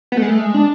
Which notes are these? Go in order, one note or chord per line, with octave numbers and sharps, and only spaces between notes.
B3
A3
G#3
A3
G#3
D4